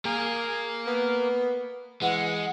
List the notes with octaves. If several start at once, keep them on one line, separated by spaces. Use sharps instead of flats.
A#3 G#4 A#4
B3
E3 G#3 F#5